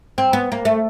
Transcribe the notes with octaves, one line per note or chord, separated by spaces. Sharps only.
C4
B3
A#3
A3